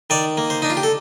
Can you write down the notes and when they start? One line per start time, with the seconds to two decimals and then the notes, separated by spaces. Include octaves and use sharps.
0.10 D#3 D5
0.37 A#3
0.50 C5
0.62 D4 D#4
0.70 F4
0.77 G4
0.83 A4